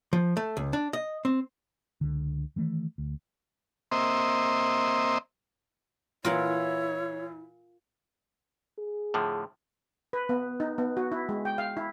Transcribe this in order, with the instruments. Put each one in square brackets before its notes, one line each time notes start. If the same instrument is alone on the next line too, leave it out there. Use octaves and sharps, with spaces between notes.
[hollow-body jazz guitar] F3
A3
C#2
D4
D#5
C4
[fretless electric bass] C#2 D3
D#3 E3 A3
D2
[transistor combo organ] A#3 C4 C5 D#5 E5
[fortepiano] A#2 E3 [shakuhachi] E4 [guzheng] F4 A#4 F#5 [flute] C#5
[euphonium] G#4
[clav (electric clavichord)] A2 D3 F3
[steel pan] B4
B3
D#4
B3
F#4
E4
G#3
G5
F5
E4